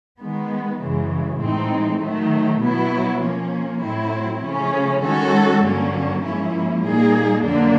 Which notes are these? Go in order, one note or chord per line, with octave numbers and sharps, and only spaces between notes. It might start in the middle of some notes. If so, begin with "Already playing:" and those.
D#3 G#3 B3
F#2 C#3 E3 G#3
A2 E3 G#3 C4 D#4
D#3 F#3 A3
B2 F#3 B3 E4
F3 A#3 C#4
A2 F#3 A3 C4 E4
C#3 F3 A3 C#4
D#3 G#3 C#4 F#4 A4
G2 D3 F#3 A#3 C#4
G#2 F3 A#3 C#4 E4
A#2 G3 A#3 D#4 G#4
F2 D3 F#3 A#3 D4